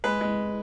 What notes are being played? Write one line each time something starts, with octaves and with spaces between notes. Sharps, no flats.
G#3 B4
G#3